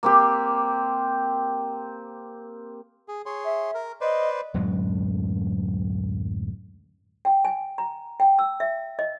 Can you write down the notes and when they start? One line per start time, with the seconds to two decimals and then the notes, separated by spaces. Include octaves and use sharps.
0.03 A#3 C4 G4
3.08 G#4
3.26 G#4 C#5 C6
3.44 E5
3.75 A#4
4.01 B4 C5 D5 D#5
4.54 D1 F#2 F#3 G#3
7.25 G5
7.45 G#5
7.78 A#5
8.20 G5
8.39 E6
8.60 E5
8.99 D#5